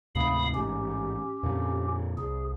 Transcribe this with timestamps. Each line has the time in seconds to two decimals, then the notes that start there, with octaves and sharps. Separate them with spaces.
0.15 D2 G#2 C3 F5 B5 D#6
0.55 A1 G#2 C#4 G4
1.43 F2 A#2 D3
2.18 C2 G#4